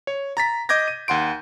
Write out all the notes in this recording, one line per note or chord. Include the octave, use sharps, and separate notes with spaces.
C#5
A#5 A6 B6
D#5 D6 G6 G#6 A#6
D#7
D#2 F#5 C6 D7